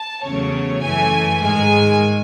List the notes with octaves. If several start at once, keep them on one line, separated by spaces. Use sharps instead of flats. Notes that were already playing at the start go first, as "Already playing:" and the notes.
Already playing: A5
E2 C#3 F#3 A3 C#5
F#2 E3 A3 G#5
G#2 D#3 G#3 G#5